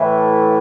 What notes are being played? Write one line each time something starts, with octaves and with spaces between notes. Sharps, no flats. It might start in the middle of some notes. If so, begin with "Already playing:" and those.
Already playing: A2 E3 A3